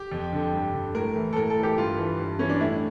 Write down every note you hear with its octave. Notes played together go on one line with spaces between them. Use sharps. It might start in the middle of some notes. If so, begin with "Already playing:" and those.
Already playing: G4
F2
D3
G2
D3
A2 A#4
E3
A4
A2 A#4
A4
E3
G4
G2 F4
E3
G2
E3 C#4
D4
A2 E4